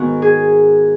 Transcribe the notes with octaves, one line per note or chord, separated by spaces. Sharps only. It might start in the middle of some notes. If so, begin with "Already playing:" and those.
Already playing: G#2 D#3 G#3 B3 F#4
G#4